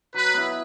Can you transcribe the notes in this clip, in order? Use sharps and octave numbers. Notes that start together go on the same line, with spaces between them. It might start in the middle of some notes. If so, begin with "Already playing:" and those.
F#3 B4
B3 E4